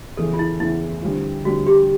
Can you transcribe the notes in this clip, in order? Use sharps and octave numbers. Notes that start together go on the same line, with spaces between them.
E2 C#3 E3 A4
F4
E4
E2 C#3 E3 E4
D3 G3 C4 F4
D3 G3 C4 F4 F#4
G4